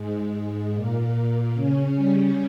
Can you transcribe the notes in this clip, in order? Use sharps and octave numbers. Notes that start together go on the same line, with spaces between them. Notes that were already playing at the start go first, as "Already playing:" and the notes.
Already playing: G#2 G#3
G#2 G#3
A#2 A#3
A#2 A#3
C#3 C#4
G3